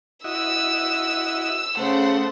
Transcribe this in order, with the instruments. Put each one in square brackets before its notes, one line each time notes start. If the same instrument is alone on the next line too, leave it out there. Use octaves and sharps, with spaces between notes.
[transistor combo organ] E4 F#4 D#5 [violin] E6
[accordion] C#3 [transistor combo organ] A3 [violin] C5 F#5